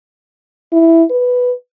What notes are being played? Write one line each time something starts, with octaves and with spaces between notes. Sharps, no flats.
E4
B4